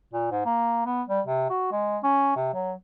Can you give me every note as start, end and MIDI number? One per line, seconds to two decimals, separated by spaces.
0.13 0.28 46
0.31 0.45 44
0.46 0.85 58
0.86 1.03 59
1.08 1.21 55
1.27 1.49 48
1.50 1.71 66
1.72 1.98 56
2.03 2.32 61
2.36 2.51 48
2.54 2.72 54